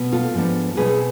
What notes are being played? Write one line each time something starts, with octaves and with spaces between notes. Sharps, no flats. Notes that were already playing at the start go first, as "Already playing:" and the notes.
Already playing: B2 B3
F4 A4
G#2 F3 B3 D4
B2 A3 C4 G#4 B4